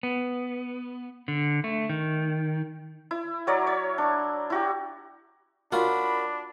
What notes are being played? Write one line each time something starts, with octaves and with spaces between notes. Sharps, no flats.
B3
D3
A3
D#3
E4
F#3 A#4 C#5 D5
C#5
D4
E4 F#4 G4
D4 F4 F#4 A#4 C#5 B5